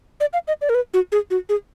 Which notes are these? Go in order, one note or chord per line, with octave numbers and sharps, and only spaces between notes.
D5
F5
D#5
D5
A#4
B4
F#4
G#4
F#4
G#4